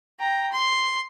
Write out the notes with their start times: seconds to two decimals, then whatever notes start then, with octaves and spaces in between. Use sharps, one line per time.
0.19 G5 A#5
0.52 C6